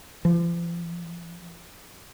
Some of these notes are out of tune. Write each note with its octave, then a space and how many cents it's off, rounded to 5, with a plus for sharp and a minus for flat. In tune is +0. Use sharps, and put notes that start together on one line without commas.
F3 -40